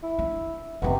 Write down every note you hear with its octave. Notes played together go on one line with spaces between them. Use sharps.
E4
D4
F#1 C3 B3 D4 G4 C#6